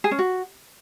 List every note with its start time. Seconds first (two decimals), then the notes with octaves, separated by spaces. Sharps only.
0.04 G#4
0.11 C#4
0.19 F#4